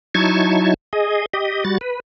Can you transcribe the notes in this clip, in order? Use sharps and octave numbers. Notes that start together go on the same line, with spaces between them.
F#3 D#4 E4 A5 C#6 G#6
G#4 D#5
G4 D#5
G3 F#4 A6
B4